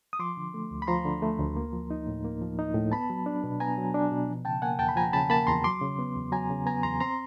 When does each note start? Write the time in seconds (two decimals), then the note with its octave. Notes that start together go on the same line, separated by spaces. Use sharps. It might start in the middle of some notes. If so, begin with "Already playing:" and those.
0.13 D#6
0.19 F3 C6 D6
0.37 D3
0.54 A3
0.71 D2
0.82 B5
0.88 F3 A#5 C6
1.06 D3
1.23 A3
1.39 D2
1.57 A#3
1.73 F3
1.91 D#4
2.07 A2
2.24 A#3
2.41 F3
2.59 D#4
2.75 A2
2.92 B3 A5 B5
3.10 F#3
3.26 D4
3.44 B2
3.60 B3 G#5 A#5
3.78 F#3
3.94 D4
4.12 B2
4.28 F3
4.45 C#3 G5 A5
4.62 A#3 F#5 G#5
4.79 E2 G5 A5
4.89 B5
4.96 F3 G#5 A#5
5.13 C#3 A5 B5
5.30 A#3 A5 B5
5.47 E2 A#5 C6
5.64 F#3 C6 D6
5.81 C#3
5.99 B3
6.16 E2
6.32 F#3 G#5 A#5
6.50 C#3
6.66 B3 G#5 A#5
6.83 E2 A#5 C6
7.00 C4 A#5 C6